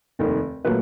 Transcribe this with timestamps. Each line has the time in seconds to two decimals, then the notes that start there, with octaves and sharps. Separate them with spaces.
0.19 F1 D#2 D#3
0.65 A#2 F#3 A3 B4